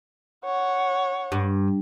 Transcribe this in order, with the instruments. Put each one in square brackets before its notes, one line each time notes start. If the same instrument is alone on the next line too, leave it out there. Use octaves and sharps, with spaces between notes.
[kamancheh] C#5 F#5
[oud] G2